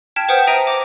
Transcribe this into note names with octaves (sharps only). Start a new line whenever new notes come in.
G5 A5 F6 G#6 B6 E7
B4 C5 F#5 G5 D#6 G6
E5 A#5 D#6 A#6 D7 D#7
D6 A#6